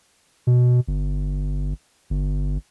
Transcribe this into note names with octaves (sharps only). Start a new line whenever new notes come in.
B2
G1
G1